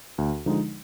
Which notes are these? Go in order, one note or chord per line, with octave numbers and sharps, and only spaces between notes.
D2
D3 F3 G#3 D#4